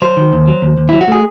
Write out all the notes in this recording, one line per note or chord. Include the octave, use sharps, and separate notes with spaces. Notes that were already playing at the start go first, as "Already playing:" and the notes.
F#3 C5
D#3
D#2
F#3
D#2
D#2
F#3 E4
F#4
A3 G#4